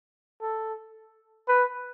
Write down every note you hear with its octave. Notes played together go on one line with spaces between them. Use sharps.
A4
B4